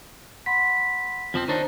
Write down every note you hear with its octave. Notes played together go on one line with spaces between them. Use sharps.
F#5 B5 C6 B6
F2 F3 C4
D#3 D4 D#4 C5 C#5 A#5